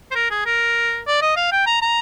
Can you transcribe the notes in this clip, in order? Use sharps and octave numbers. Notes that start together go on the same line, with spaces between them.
C5
A#4
G#4
A#4
D5
D#5
F5
G5
A#5
A#5